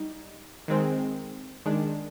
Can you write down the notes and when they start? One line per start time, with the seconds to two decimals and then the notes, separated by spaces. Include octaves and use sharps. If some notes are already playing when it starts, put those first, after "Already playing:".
Already playing: G3 D#4
0.68 D#3 G#3 C4
1.66 D#3 G#3 D4